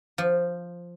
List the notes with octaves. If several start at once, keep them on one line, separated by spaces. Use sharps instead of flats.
F3